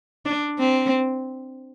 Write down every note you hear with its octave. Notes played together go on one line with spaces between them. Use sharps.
D4
C4